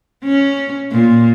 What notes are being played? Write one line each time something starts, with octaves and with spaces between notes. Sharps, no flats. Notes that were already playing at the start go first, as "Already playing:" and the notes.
C#4
A#2